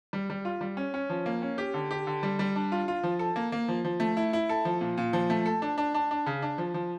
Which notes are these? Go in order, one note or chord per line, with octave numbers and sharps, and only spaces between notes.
G3
G3
F4
G3
C#4
C#4
F3
A#3
C#4
G4
D3
G4
D3
G3
G3
D4
F4
F4
F3
A4
A#3
A#3
F3
F3
A3
E4
E4
A4
F3
A#2
A#2
F3
A3
A4
D4
D4
D4
D4
C#3
D4
F3
F3